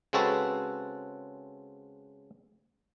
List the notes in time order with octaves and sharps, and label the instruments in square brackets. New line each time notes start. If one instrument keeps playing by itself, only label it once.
[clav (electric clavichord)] C#3 G#3 C4 F#4 A4 B4